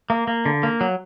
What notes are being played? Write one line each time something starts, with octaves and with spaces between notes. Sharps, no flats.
A#3
A#3
D3
A#3
F#3